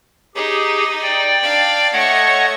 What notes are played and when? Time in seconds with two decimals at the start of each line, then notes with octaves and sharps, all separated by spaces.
0.35 D#4 G4 G#4
1.02 D5 G5
1.42 D4 F5
1.93 A3 C#5 D#5 F#5 C#6